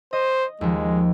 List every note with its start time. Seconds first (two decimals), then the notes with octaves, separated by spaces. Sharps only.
0.13 C5 D#5
0.61 D#2 F3 G#3